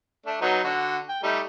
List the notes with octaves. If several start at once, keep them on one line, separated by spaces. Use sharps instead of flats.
A3 D4
F#3 B3 D#4
D3 F#4
G5
G3 A3 D#4